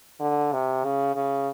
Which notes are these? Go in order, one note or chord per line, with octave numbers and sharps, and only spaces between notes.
D3
C3
C#3
C#3